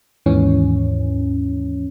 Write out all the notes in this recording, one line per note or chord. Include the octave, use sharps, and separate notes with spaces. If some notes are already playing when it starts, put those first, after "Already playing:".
D#2 G#2 E3 C#4